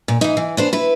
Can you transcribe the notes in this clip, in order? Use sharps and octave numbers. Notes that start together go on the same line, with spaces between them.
A#2
E3 D#4
E3
B3 D4 C5
E4 B4